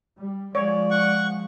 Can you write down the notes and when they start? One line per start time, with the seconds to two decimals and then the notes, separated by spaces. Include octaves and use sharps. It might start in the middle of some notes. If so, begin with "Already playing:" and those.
0.17 G3
0.55 F3 G#3 C#5 D5
0.91 F#5 C#6